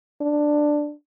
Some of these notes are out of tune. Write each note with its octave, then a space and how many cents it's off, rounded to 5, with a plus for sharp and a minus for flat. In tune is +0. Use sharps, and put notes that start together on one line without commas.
D4 +10